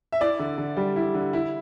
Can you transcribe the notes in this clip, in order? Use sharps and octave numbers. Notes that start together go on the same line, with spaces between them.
E5
E4 D5
D3
D3
G3
E4
D3
E4